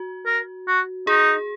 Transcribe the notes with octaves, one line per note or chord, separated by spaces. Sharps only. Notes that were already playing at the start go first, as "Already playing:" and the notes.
Already playing: F#4
A#4
F#4
D#4 G#4